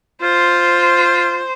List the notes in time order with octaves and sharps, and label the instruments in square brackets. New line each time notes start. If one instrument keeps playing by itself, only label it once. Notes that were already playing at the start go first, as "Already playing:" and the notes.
[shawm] F4 [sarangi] C5